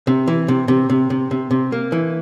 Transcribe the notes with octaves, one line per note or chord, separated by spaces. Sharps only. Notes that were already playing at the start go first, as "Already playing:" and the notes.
C3
E3
C3
C3
C3
C3
C3
C3
A#3
E3